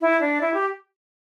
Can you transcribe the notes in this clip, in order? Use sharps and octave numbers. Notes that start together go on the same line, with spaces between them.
E4
D4
E4
G4